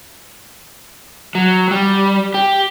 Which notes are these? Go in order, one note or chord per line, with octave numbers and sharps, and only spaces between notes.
F#3
G3
G4